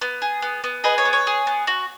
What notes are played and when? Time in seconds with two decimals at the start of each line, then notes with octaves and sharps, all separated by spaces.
0.01 B3
0.22 G#4
0.42 B3
0.64 B3
0.84 G#4 B4 D#5
0.98 C#5
1.05 B3
1.13 C#5
1.27 G#4
1.47 B3
1.67 F#4